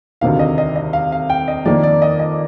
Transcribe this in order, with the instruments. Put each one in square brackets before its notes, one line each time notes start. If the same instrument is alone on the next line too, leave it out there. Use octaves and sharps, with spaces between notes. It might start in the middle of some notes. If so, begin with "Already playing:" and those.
[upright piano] D2 C3 D#3 [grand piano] F5
[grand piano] D#5
D#5
D#5
F5
F5
G5
D#5
[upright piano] F2 D#3 A#3 [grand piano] D5
[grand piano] D5
D#5
D#5